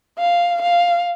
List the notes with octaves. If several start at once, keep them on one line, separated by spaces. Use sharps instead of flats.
F5
F5